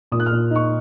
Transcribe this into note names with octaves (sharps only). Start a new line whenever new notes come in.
A#2 D#6
F#6
F6
A#2
D#4 C#6